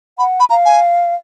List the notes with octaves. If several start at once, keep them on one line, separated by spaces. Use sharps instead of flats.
F#5 B5
B5
F5 A#5
G#5